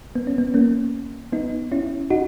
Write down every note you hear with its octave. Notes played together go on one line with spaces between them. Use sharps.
B3
C#4
B3
A#3 C#4
B3 D#4
C#4 E4
D#4 F#4